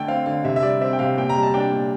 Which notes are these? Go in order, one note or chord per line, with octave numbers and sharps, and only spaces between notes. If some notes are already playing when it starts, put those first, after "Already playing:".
Already playing: D3 A3 G5 A5
C4 F5
D3 F5
C3 E5
E5
G3 D5
C4 E5
G5
C3 F5
A#2 G5
A#5
G3
A5
D4 G5
A#2